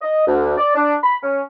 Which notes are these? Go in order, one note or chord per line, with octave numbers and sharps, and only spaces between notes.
D#5
D2
D5
D4
B5
C#4